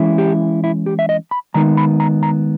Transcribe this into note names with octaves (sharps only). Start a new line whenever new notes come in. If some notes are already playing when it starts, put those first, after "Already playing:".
Already playing: E3 G#3 C#4 E4
G4
E4
G4
E5
D#5
B5
D#3 G#3 B3 D#4 A#5
B5
A#5
A#5